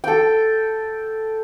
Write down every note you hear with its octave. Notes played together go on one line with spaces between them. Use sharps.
A4 G5